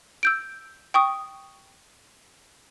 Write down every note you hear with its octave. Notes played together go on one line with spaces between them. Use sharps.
E6 G6 D7
G5 C#6 D#6